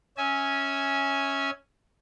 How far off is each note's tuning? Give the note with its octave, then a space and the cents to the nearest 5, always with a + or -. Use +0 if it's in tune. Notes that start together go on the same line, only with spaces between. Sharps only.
C#4 +0 E5 -30 G#5 +0